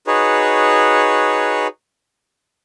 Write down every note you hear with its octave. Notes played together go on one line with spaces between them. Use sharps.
D#4 F#4 G#4 B4 C#5